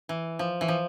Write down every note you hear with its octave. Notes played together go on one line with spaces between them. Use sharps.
E3
F3
E3
F3